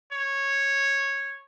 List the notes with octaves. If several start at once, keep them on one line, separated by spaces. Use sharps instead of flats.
C#5